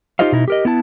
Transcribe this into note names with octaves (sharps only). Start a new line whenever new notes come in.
D#4 F4 G4 C5 D#5 F5
B2 D#4 E4
G4 A#4 D#5
B3 E4 A5